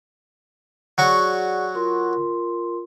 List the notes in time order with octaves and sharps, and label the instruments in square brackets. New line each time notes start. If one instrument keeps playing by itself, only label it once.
[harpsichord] F#3 F#4 C#6 [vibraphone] G#4 D5 F#5
[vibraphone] F4 A#4 C6